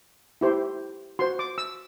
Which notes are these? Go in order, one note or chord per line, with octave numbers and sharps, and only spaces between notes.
E4 G4 C5
F#4 C5 C6
D6
E6